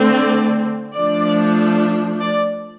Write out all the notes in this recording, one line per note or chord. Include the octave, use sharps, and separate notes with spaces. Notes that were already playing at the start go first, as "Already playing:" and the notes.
Already playing: D3 A3 C4
D5
F3 A3 D4 D5
D5